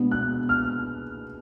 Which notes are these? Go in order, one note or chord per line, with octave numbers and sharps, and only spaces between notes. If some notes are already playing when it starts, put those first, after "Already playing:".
Already playing: B2 G#3 B3 D4
F#6
F6